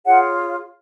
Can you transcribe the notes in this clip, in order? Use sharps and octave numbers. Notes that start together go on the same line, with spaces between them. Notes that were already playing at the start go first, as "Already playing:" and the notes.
F4 G#4 C#5 F#5